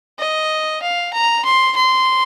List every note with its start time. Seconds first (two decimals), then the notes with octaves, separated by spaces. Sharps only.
0.19 D#5
0.82 F5
1.13 A#5
1.45 C6
1.76 C6